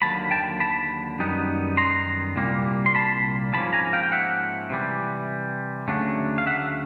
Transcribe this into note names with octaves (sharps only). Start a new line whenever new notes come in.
D#2 D3 F#3 A#3 A5 B5
G5 A5
A5 B5
F#2 D#3 G3 B3 D#4
A#5 C6
C2 A#2 G3 A#3
C6
A5 B5
G#2 F3 A#3 C#4 A5 B5
G#5 A#5
F5 G5
G5
E5 F#5
C3 E3 G3
D2 C#3 F#3 A3 D4
F5
E5 F#5